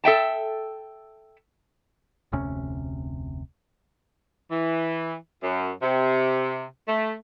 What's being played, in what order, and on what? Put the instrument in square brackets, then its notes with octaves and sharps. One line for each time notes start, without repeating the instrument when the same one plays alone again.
[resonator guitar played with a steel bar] A4 E5 G5 A5
[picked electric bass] F1 D2 C3 C#4
[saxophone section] E3
F#2
C3
A3